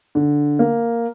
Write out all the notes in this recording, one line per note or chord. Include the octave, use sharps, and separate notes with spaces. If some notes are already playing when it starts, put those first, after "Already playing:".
D3
A#3